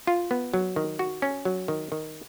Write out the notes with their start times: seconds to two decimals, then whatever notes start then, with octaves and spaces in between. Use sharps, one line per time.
0.07 F4
0.31 B3
0.54 F#3
0.76 D#3
0.99 F#4
1.22 C#4
1.45 F#3
1.68 D#3
1.92 D#3